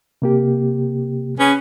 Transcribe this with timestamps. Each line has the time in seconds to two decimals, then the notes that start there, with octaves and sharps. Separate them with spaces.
0.22 C3 A#3 G4
1.38 C#4 G#4 B4